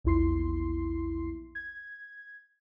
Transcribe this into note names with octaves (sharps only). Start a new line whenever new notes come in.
A#1 E2 E4 C6 C7
G#6